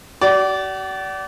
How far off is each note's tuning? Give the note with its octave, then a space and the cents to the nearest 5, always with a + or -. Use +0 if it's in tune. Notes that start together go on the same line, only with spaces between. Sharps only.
F#4 +45 D5 -20